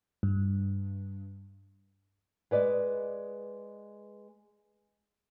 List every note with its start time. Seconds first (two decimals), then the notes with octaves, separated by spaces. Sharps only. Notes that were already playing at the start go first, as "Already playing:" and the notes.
0.23 G2
2.51 G#3 B4 D5 D#5